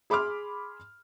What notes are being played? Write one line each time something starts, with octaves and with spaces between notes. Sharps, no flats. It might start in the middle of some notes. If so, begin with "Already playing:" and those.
G#4 B5 C6 D6 F6